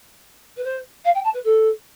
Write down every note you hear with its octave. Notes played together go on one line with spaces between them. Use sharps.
B4
C5
F5
G5
A5
B4
A4